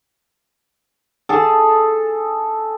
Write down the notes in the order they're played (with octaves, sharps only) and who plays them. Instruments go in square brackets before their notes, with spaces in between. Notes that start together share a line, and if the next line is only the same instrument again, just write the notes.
[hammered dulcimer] G#4 A4